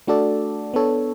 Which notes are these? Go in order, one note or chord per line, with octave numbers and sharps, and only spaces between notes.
A3 D4 F#4 A4 D5
B3 D4 A4 C#5